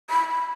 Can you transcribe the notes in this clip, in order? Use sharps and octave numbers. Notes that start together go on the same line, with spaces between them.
B5